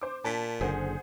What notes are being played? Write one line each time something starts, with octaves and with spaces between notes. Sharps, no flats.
C5 D6
A#2 A5 B6
F#1 D3 G#4 C5 F#5